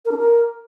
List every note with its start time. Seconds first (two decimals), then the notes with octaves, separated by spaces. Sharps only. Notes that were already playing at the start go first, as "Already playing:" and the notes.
0.05 A#4
0.12 D4
0.18 A#4